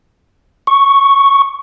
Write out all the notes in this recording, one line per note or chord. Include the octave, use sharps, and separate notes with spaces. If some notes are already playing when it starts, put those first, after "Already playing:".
C#6